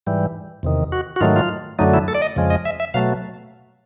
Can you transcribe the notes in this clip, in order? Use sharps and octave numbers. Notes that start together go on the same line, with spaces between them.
G#2 E3 G3
E2 C3 D#3
F#4
F#4
G#2 D#3 F#3 A3 F4
F4
F#2 D3 F#3 A3 D#4
E4
A4
D5
D#5
F2 C#3 F3 G#3
D#5
E5
E5
B2 F#3 A3 F5